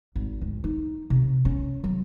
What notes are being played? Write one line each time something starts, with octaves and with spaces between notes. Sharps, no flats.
G#1
D2
D#4
C3
C#4
F#3